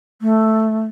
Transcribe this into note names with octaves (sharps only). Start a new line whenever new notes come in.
A3